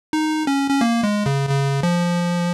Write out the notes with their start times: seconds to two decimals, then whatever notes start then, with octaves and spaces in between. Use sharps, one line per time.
0.13 D#4
0.47 C#4
0.70 C#4
0.81 A#3
1.03 G#3
1.26 C#3
1.49 C#3
1.83 F3